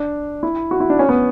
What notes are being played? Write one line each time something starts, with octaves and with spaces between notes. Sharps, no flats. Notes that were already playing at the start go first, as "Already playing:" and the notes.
Already playing: D4
E4
F#4
E4
D4
C#4
B3